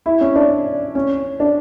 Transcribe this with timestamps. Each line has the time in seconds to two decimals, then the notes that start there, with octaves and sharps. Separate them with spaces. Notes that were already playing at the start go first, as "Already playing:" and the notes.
0.06 E4
0.21 C#4
0.36 D4
0.95 C#4
1.40 D4